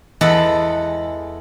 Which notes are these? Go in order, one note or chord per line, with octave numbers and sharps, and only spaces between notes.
E2 G#3 A4 B4 F#5